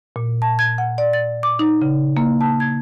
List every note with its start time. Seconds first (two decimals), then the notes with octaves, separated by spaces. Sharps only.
0.16 A#2
0.42 A5
0.59 G#6
0.78 F#5
0.98 D5
1.13 A6
1.43 D6
1.59 D#4
1.82 C#3
2.17 A#3
2.41 A5
2.60 G#6